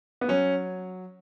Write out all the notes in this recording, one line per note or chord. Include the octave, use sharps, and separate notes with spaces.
B3
F#3 C#4